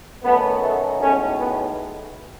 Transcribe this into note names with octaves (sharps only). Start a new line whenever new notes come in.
F#2 D#3 F#3 A3 B3
A3
B1 A2 G#3 A3 C#4
B3